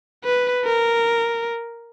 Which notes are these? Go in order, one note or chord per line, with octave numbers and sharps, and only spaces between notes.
B4
A#4